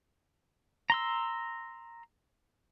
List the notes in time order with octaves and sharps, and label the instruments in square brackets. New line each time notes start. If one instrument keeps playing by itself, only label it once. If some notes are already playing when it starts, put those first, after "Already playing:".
[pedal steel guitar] A#5 C6 E6